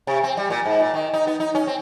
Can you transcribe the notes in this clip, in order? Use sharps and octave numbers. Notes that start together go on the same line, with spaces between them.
C3
C4
G3
A#2
G#2
A#2
D#3
D#4
B3
D#4
C#4
C4